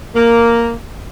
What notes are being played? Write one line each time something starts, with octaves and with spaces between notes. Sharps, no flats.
A#3